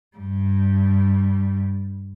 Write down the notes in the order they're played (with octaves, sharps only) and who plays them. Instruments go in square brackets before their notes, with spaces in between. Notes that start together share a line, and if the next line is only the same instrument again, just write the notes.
[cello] G2 G3